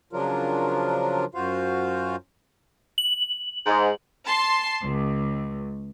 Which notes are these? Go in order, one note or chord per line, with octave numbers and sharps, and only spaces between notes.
C#3 F3 F#3 D4 F4 A#4
F#2 F4 F#4 C5 F5
F#7
G#2
A5 C6
C#2